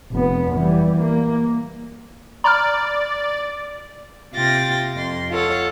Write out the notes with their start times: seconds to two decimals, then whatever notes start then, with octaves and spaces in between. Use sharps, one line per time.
0.12 F1 B3
0.55 E3 G3
1.01 A#3
2.44 D5 A#5 B5 F6
4.34 C3 F4 G5 A6 A#6
4.96 F2 C6
5.29 F4 A4 C#5 F#5